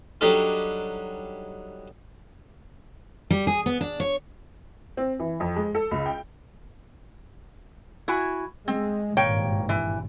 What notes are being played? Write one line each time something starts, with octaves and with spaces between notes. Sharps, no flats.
F#3 G3 D4 D#4 G4 A4
G3
G#4
B3
D4
C#5
C4
E3
F2
G#3
A4
C#2
G5
E4 F#4 G#5
G#3 C4
G#1 G2 A#2 A#3 C#5 G5
E3